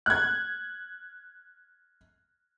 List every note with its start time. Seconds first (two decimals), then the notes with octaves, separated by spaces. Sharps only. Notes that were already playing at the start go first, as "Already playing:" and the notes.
0.06 F#6 G#6